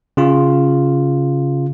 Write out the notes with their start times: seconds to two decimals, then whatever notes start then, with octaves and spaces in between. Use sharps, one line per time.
0.17 C#3 F4